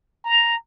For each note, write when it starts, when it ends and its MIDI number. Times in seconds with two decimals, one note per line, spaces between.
0.25 0.55 82